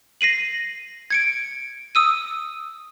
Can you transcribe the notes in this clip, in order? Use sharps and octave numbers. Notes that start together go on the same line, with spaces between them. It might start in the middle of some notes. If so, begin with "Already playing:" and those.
A#6 C7 D#7 F#7
G#6 C#7 D7
D#6 E6 D#7